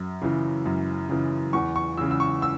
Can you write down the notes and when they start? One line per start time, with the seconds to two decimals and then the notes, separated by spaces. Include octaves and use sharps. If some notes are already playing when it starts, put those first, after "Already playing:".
Already playing: F#2
0.22 C#3 E3
0.66 F#2
1.09 C#3 E3
1.53 E2 C#6
1.76 C#6
1.97 C#3 E3 E6
2.11 E6
2.20 C#6
2.42 E6